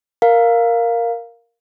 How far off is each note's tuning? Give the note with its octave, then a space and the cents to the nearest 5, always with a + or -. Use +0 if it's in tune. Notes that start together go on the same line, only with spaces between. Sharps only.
A#4 +0 F5 +0